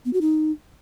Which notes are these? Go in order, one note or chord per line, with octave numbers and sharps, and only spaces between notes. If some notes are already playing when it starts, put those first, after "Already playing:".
B3
F#4
D#4